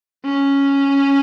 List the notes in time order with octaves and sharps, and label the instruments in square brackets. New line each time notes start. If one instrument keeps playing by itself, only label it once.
[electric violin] C#4